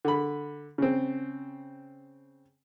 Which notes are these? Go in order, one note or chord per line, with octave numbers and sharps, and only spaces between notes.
D3 B5
C#3 C4